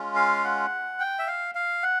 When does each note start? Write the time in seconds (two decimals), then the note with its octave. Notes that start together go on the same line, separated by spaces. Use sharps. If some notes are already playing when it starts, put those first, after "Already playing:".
Already playing: G#3 C#4 F4
0.16 F5
0.44 F#5
1.00 G5
1.19 E5
1.27 F5
1.55 F5
1.83 F#5